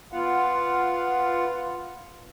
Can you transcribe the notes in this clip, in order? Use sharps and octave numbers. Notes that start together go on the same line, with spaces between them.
B3 F4 F5 F#5